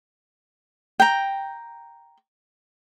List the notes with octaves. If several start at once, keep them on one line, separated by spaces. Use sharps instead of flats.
G5 A#5